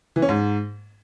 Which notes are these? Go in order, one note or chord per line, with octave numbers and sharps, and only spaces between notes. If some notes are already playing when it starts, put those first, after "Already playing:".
E3
C#4
G#2